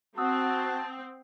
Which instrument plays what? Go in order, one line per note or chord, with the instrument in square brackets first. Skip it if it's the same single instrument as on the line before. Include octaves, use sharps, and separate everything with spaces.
[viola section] C4 [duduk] F#4 [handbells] F#5 D#6 E6 [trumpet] A5